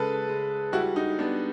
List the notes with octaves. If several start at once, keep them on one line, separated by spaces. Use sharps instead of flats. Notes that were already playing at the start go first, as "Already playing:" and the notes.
Already playing: C#3 G#3 A4 B4
G#3
G3 E4 F#4
D#4
B3 D4